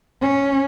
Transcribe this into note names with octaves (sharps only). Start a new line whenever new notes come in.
C#4